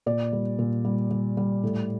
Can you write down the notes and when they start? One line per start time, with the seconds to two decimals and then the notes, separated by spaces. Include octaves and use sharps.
0.06 A#2 D5
0.33 G3
0.59 A#2
0.85 G3
1.11 G3
1.37 G3
1.63 A2